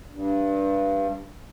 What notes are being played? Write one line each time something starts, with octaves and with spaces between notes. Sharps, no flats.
G2